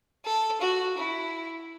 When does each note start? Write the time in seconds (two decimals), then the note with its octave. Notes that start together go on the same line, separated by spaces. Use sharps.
0.25 A4
0.61 F#4
0.98 E4